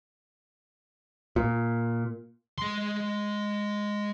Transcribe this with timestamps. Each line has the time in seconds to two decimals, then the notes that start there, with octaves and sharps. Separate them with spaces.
1.36 A#2
2.58 G#3 C6